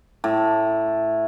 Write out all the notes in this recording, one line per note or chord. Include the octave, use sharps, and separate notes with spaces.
A2